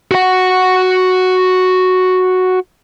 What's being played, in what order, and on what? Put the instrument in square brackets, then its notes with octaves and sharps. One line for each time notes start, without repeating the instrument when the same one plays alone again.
[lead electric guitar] F#4 F#5